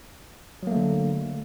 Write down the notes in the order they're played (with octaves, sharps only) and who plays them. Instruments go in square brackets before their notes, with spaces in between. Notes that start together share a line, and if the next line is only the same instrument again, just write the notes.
[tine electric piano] F#3
A#3
A3
D3